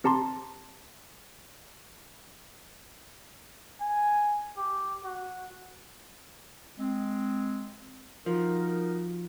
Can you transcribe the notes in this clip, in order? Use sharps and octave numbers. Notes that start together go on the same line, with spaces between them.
C4 G4 A5 A#5 C6
G#5
G4
F#4
G#3 C4
F3 D#4 F#4 A#4